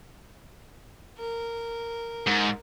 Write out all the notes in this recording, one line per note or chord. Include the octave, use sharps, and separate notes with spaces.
A#4
G#2